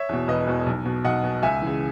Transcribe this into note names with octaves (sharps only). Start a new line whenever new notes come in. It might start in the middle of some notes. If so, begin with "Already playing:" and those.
Already playing: C#5 E5
E2 B2
E1 B4 D#5
E2 B2
B1
B2
B1 D#5 F#5
B2
C#2 E5 G#5
C#3 E3